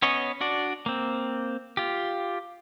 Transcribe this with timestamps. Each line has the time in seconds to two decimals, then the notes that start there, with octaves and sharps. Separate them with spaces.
0.02 B3 C#4 C#5 D#5
0.41 D4 F#4 D5
0.86 A#3 C4
1.77 F4 G4